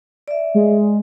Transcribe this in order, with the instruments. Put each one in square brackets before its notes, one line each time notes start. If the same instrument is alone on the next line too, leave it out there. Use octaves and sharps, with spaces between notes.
[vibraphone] D5 E5
[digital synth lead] G#3